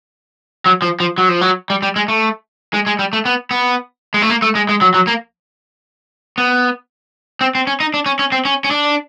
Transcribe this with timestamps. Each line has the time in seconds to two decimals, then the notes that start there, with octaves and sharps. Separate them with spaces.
0.66 F#3
0.82 F3
1.00 F3
1.18 F#3
1.29 F3
1.41 F#3
1.70 G3
1.83 G3
1.96 G#3
2.08 A3
2.74 G#3
2.87 G#3
2.99 G3
3.13 A3
3.25 B3
3.51 B3
4.14 G#3
4.22 A3
4.30 A#3
4.42 A3
4.55 G#3
4.69 G#3
4.81 F#3
4.94 F#3
5.07 A#3
6.38 B3
7.41 C4
7.55 C4
7.67 C#4
7.80 D#4
7.94 D4
8.06 C#4
8.19 C#4
8.32 C4
8.45 C#4
8.64 C#4
8.71 D4